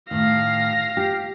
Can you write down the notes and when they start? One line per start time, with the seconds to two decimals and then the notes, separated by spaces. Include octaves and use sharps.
0.11 A2 D#3 F5 A#6
0.97 G4